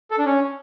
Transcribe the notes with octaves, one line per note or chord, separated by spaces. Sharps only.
A4
D4
C#4